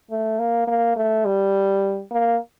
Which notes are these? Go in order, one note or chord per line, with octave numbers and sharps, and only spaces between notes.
A3
A#3
A#3
A3
G3
A#3